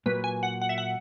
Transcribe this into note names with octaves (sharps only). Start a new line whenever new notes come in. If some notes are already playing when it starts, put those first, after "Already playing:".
A#2 F#3 A#3 B4
G#5
F#5
F#5
E5
F#5